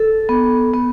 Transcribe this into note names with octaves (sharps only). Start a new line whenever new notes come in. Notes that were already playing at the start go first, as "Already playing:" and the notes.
Already playing: A4
B3
B3